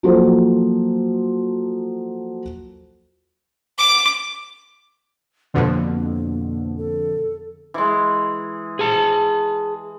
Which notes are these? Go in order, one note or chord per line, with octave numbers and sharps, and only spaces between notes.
F3 F#3 A#3 F#4 A4 C5
D6
F2 B2 D3 A#3
A4
E3 G#3
G#4 A5